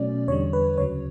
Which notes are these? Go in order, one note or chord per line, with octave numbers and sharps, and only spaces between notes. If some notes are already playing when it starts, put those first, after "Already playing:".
Already playing: B2 F#3 A3 C#4 D5
E2 D3 G3 C#5
B4
D2 C#3 F#3 C#5